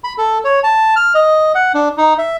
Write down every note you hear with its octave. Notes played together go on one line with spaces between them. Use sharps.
B5
A4
C#5
A5
F6
D#5
F#5
D4
D#4
E5